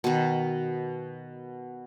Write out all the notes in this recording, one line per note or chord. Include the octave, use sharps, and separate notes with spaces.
B2 D#3